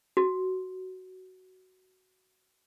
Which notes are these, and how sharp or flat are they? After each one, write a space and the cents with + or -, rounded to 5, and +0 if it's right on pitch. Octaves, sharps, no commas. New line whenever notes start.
F#4 +10